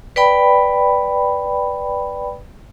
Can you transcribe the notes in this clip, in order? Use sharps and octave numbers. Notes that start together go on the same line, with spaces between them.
B4 D5 G5 B5